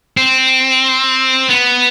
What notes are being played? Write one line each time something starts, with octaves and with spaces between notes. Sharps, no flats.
C4
B3